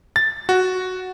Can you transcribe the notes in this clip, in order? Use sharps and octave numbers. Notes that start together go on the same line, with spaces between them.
A6
F#4